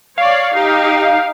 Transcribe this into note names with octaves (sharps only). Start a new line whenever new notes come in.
C#5 D5 F5
D#4 G4